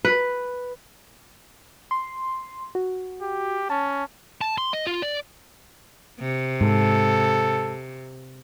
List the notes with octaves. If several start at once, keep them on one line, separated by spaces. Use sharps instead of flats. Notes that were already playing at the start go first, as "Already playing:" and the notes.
B4
C6
F#4
G4
C#4 A5
A5
C6
D#5
F4
D5
C3
G#2 A4